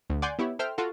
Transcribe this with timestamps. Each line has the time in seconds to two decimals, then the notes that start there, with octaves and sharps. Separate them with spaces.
0.10 D2
0.22 D5 F#5 G#5 C6 G6
0.39 B3 E4 G4 C#5
0.59 A4 C5 E5 G5 F6
0.78 F4 F#4 A4